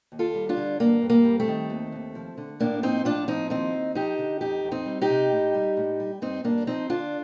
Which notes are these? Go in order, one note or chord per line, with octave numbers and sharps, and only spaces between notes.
D#2
F4 A4
G3
D4 F4
D3
G2 A#3
G2
A#3
G3
A3 C4
D#3
D#2
D#2
F3
D3
A2 A#3 D4
F3 C4 D#4
A2 D4 F4
F3 C4 D#4
D#2 C4 D#4
D#2
F3 D#4 G4
D3
F2 D#4 G4
F2
C4 D#4
G3
D#4 G4
C3
A2
G3
A2
G3
G2 C4 D#4
G2 A#3 D4
F3 C4 D#4
D3 D4 F4